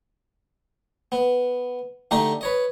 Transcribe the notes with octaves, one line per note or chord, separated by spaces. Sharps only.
B3
D3 A3 D#4 G4 D#5 A#5
B4 C#5 D#5